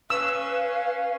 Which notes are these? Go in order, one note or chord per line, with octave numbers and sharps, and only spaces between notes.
C#4 B4 F5 E6